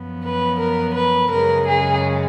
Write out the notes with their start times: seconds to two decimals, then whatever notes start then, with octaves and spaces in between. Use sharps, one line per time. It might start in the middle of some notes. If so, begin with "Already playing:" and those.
Already playing: F#2 F3 B3
0.24 B4
0.60 A#4
0.96 B4
1.31 F#2 C#3 G#3 A#4
1.67 G#4